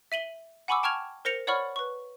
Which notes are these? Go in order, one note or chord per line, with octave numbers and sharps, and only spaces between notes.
E5 D#7 F#7 G7
F#5 G#5 B5 C#6 D6 E6
G5 A5 C#6 F6 G#6 F7
A#4 C5 A#6 C#7 F7
C#5 D5 F#5 B5 C#6 F6
B4 C#6